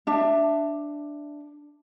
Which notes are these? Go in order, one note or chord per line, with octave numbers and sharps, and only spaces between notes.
D4 E5